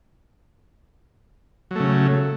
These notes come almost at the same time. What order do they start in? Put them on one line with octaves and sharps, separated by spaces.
F#3 A3 C#3